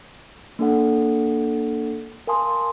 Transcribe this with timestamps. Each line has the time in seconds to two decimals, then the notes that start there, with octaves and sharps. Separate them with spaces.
0.59 A#3 D4 A4 F#5
2.27 A#4 F5 G#5 A5 C6 D#6